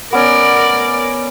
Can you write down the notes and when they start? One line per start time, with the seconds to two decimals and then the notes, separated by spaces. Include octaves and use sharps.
0.13 B3 C#4 A#4 D5